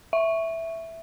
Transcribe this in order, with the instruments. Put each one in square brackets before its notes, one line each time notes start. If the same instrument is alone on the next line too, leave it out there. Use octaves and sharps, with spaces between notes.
[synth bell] E5